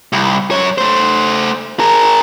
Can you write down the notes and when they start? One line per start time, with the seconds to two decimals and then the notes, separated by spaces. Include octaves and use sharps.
0.13 C2
0.51 F#2 C#5
0.78 A3 C5
1.79 G#4 A#4